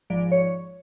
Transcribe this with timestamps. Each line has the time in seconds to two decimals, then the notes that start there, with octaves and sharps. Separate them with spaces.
0.10 G#1 G#2 F3 D5
0.32 C#5